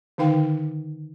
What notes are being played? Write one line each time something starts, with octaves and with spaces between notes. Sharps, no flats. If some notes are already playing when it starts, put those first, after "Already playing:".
D3 D#3 D#4 F5 G5